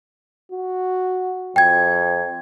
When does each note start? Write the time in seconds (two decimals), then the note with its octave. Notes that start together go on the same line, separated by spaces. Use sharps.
0.52 F#4
1.56 F2 G5 G#6